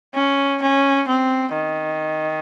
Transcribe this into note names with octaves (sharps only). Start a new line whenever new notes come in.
C#4
C#4
C4
D#3